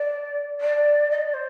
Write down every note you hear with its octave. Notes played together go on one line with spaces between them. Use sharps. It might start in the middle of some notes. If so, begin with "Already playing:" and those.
Already playing: D5
D5
D#5
D5
C5